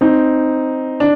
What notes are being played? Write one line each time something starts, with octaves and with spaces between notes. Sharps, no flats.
C4 D#4
D4